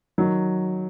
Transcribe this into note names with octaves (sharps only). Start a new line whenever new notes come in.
D#3 F#3